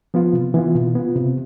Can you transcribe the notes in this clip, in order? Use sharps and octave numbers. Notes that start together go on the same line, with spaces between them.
F3 B3 F4
C3
E3 B3 F4
B2
B3 F4
C3